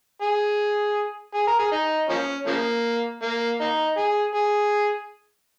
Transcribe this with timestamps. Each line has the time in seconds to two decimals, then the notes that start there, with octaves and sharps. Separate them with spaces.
0.22 G#4
1.35 G#4
1.47 A#4
1.59 G#4
1.72 D#4
2.10 F3 A#3 C#4
2.47 C#3 F3 A#3
3.23 A#3
3.61 A#3 D#4
3.97 G#4
4.35 G#4